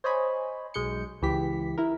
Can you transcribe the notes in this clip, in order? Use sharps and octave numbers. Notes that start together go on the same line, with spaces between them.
C5 C#5 D#5 G#5 B5
B1 G#3 G6 C#7
C#2 E3 G4 B6
E4 A#4